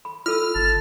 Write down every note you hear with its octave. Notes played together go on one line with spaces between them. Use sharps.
B5
F4 A4 E6 F6
G1 A5